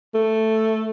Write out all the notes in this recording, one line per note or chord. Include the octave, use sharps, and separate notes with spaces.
A3